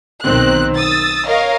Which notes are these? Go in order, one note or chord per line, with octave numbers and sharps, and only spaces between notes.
B1 D#3 C4 F#6
D#6 E6 A6
A#4 C#5 D#5 F5